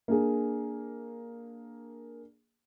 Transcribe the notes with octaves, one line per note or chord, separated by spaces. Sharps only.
A#3 D4 G#4